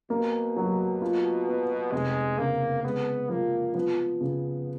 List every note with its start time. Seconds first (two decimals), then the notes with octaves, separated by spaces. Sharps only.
0.10 B2 A#3
0.56 F#3
1.02 F4
1.47 B3
1.92 F1 G#3
2.38 C#3 A#3
2.84 G#3 B3
3.29 F3 A#3
3.74 F3 B3
4.21 C#3